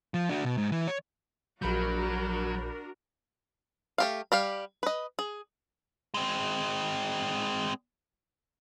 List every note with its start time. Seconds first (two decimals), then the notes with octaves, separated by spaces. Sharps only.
0.14 F3
0.29 D4 F#4
0.44 B2
0.58 G#2
0.71 E3
0.88 C#5
1.62 A#1 F#3 D4 F#4 A#4 B5 G6
3.98 A3 G4 F5
4.32 G3 G4 F5
4.83 B4 D#5
5.19 G#4
6.14 G#3 C4